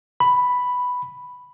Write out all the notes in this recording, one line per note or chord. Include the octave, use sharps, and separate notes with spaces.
B5